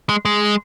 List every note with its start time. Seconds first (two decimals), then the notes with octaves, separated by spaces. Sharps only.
0.09 G#3
0.25 G#3